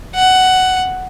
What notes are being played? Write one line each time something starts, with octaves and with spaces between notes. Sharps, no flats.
F#5